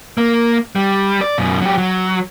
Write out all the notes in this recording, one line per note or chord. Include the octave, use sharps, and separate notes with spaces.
A#3
G3
D5
F#2 B2
F#3 G4
F#3